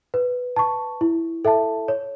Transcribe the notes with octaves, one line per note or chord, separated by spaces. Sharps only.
B4
A5 C#6
E4
A4 E5 A5
C#5